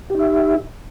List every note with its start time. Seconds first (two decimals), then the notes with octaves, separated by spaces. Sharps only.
0.10 G4
0.15 D#4
0.19 E5